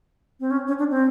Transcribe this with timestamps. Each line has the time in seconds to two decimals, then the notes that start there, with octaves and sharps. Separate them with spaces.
0.40 C4
0.51 C#4
0.67 C#4
0.79 D4
0.90 C4